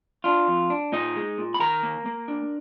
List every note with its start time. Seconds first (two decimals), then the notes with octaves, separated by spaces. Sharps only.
0.24 D4 F4
0.48 F2
0.70 D4
0.92 A#2 D#4 D#5
1.16 G#3
1.38 A#2
1.54 B5
1.60 D#3 A#4 A#5
1.83 A#3
2.06 A#3
2.28 D4